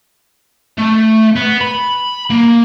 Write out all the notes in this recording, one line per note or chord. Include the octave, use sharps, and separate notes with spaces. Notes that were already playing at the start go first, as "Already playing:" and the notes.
A3
B3
B5
A#3